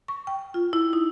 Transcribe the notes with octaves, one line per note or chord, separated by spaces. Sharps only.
C#6
G5
F4
E4
D#4